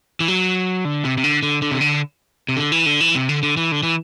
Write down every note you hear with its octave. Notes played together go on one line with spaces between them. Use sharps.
E3
F#3
D3
C3
C3
D3
D3
D3
C3
D3
C3
D3
E3
D3
E3
C3
D3
D3
E3
D3
E3